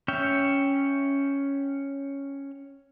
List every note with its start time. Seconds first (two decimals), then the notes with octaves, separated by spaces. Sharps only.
0.08 C#4 C#5 E5 G5